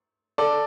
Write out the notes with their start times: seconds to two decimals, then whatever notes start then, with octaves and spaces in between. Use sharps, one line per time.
0.38 A4 D5